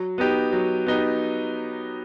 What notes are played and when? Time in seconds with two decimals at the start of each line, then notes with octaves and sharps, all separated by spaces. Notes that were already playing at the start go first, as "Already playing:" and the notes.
Already playing: F#3
0.18 B3 D#4 G4
0.52 F#3
0.87 B3 D#4 G4